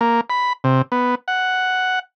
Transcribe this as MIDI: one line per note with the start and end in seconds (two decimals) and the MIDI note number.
0.01 0.21 58
0.30 0.53 83
0.64 0.82 48
0.92 1.15 59
1.28 1.99 78